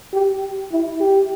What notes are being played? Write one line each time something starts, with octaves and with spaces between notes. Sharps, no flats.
G4
E4
G4